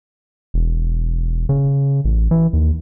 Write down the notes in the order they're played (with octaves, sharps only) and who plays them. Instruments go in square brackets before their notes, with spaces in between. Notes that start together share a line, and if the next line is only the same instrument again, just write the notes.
[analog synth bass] E1
C#3
A1
E3
D#2